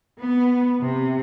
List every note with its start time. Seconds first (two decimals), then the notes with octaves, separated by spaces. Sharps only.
0.20 B3
0.83 C3